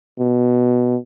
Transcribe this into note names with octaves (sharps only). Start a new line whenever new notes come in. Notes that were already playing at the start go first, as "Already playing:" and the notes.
B2